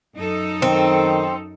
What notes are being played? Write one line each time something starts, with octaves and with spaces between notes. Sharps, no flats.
F#2 D#4 A4
D#3 C4